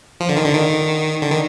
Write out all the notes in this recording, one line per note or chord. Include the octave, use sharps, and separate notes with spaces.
F3
D3
D#3
D3
D#3
D3
D#3